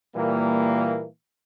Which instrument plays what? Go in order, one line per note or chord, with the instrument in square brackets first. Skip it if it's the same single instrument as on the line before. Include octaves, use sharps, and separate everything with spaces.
[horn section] A#2 E3 G3 A#3